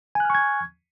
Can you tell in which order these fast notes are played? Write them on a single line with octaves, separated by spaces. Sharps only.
G#5 F#6 F6 C#6 G#6